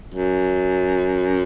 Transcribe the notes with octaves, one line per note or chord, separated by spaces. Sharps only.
F#2